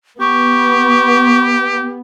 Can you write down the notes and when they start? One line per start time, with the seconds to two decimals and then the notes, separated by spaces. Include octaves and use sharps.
0.20 B3 G4 C#6